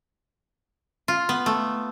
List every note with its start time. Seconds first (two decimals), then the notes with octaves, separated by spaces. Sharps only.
1.08 F4
1.29 B3
1.46 A3